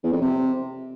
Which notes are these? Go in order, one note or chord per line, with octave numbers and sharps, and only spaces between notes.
E2
F2
C3